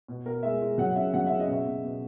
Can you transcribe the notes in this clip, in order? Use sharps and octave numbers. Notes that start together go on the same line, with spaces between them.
B2
B2 A#4
G#3 E5
G#3
F#3 F#5
C#3 E5
F#3 F#5
C#3 E5
D#5
B2
E5
B2
B2